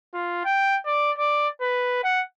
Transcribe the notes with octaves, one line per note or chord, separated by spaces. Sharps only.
F4
G5
D5
D5
B4
F#5